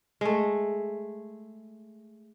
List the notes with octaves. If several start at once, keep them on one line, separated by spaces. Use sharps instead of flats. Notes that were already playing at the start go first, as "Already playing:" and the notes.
G#3 A3